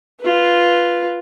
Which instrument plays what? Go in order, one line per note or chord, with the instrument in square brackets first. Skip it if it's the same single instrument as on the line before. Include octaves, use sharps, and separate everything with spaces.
[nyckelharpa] F4 B4